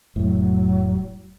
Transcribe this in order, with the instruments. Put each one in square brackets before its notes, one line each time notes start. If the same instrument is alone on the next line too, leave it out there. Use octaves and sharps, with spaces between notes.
[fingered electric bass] F1 A2 [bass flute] F#3